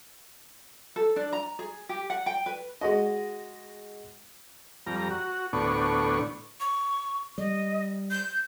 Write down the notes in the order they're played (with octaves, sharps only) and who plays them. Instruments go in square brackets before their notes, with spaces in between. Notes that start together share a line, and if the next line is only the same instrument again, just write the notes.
[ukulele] A4
D4
A#5
G#4
G4
F#5
G5
B4
[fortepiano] G#3 F#4 D#5
[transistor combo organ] F2 G3 A#5
F#4
D2 A2 B3 D4 C#6
[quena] C#6
[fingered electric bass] G3 [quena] D#5
[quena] G6